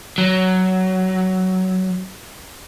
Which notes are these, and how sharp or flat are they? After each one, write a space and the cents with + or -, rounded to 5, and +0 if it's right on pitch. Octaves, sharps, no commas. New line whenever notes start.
F#3 +10